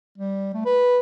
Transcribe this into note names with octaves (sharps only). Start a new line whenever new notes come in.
G3
A3
B4